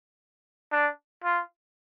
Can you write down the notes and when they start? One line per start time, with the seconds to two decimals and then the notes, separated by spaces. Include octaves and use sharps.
0.72 D4
1.24 F4